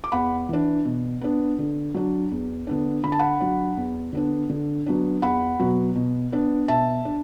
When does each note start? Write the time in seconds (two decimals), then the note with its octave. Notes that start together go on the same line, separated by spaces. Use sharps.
0.04 D6
0.12 E2 F#5 B5
0.49 E3 D4
0.85 B2
1.21 B3 D4
1.59 D3
1.94 F#3 D4
2.31 E2
2.67 D3 B3 D4
3.04 D3 B5
3.12 A5
3.19 F#5 B5
3.40 F#3 D4
3.77 E2
4.13 D3 B3 D4
4.50 D3
4.86 F#3 B3 D4
5.22 E2 F#5 B5
5.60 B2 F#3 B3
5.95 B2
6.32 B3 D4
6.68 B2 E5 A5
7.05 D4